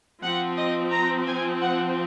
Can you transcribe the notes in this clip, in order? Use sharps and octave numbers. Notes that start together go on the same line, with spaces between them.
F3 C4 F#5
D#5
A#5
G#5
F#5